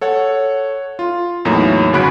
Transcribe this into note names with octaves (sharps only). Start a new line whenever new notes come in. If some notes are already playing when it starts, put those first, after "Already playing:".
A4 C#5 F#5
F4
E2 A2 F#3 A#3 D#4 C#5
G1 C#3 F#4 B5 F#6 D7